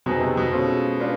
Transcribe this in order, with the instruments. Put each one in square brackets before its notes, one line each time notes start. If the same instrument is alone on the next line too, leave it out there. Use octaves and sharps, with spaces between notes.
[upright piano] B2 [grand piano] C4 D#4 G#4 B4
[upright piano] C3
B2
[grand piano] G#3 C#4 F4 A4 C5
G#3 B3 D4 F4